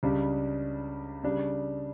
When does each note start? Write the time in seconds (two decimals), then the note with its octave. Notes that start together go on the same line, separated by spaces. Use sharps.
0.03 C#2 C#3 G3 D4
1.24 C#3 G3 D4